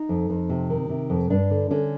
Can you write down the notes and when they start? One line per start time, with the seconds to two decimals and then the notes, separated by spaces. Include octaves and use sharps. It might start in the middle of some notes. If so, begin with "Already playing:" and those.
Already playing: D#4
0.09 F2
0.30 F2
0.50 C3
0.70 D#3
0.89 C3
1.10 F2
1.30 G2 D4
1.51 D3
1.71 D3 C#4